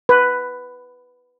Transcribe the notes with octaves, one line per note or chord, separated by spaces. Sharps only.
B4